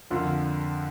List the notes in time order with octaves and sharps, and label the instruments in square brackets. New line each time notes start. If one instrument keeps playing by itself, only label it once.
[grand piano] F2 D3 F3 A#3 F4